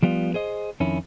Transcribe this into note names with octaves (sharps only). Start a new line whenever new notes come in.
F3 G3 B3 F4
G#4 C5 D#5
F2 D#3 C#4 E4